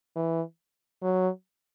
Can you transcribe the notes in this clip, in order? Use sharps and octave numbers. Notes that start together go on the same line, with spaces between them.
E3
F#3